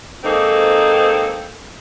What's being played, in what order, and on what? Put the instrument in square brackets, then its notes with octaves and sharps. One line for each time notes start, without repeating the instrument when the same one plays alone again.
[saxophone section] G#2 A#3 C4 D#4 A4